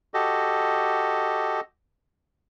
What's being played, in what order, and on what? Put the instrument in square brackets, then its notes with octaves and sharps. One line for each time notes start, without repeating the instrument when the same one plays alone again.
[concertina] F#4 G4 A4 D#5